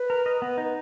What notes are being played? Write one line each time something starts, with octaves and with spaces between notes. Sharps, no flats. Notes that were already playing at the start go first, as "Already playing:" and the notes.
Already playing: B4
A#4
D#5
B3
D#4